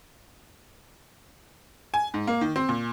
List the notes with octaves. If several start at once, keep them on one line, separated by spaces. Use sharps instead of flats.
G#5
G#2
A#3
D#3
C4
A#2